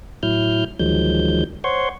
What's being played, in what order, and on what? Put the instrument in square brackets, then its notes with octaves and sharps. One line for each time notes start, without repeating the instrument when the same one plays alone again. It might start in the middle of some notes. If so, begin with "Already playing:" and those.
[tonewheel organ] A2 F#3 E4 F6 G6
D2 D#3 F3 F#3 G#3 G6
C5 C#5 F#5 C6 C#6